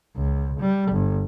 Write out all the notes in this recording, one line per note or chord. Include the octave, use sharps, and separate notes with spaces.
C#2
G3
G1